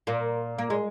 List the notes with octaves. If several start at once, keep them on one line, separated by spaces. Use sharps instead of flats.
A#2 A#3
A#3
G#3